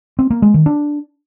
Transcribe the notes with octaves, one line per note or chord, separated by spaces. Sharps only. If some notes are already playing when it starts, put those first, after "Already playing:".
C4
A#3
G#3
D#3
D4